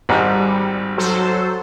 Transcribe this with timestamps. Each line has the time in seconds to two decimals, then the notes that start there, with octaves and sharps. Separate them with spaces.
0.09 G#1 G#2 G3
0.97 F#3 A4 C5